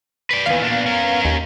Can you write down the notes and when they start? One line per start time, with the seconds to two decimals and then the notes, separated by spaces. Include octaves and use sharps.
0.31 B4 D5
0.46 D#2 E3 B3 F5
0.61 A#2 D4
0.86 C#4 A#4
1.25 D#2